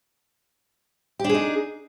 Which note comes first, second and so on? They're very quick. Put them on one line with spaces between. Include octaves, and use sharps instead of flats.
G4 D4 G#4 D#4